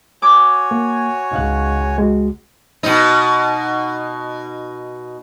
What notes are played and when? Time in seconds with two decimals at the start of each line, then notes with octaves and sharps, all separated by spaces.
0.22 F#4 C#5 G#5 D6
0.71 A#3
1.32 C#2 D#4 F5 F#6
1.98 G#3 F#4
2.83 B2 D#4